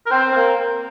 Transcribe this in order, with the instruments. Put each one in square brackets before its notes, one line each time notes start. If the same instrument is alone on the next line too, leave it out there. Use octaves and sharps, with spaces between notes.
[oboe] A#4
[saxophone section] C4 [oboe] C5
[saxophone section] C4
A#3